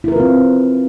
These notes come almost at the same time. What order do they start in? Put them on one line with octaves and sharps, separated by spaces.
E4 A#4 B4 F4 C4